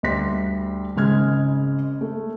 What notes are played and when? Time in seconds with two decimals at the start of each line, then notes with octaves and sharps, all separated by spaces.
0.03 D2 G3 C6 B6
0.96 G#1 C#3 G#3 F6 G#6
2.01 A3